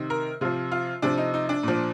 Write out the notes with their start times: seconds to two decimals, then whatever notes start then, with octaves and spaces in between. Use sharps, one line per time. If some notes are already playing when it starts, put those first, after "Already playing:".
Already playing: C3 D#3
0.10 A#4
0.41 C3 F3 F4
0.72 F4
1.02 C3 F3 D4
1.17 D#4
1.34 D#4
1.49 D4
1.63 A#2 F3